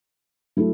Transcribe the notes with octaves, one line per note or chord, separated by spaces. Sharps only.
F#3 A3 E4 A4